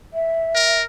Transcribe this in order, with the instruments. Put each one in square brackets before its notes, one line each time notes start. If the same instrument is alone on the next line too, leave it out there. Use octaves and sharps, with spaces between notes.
[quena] E5
[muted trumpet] A#4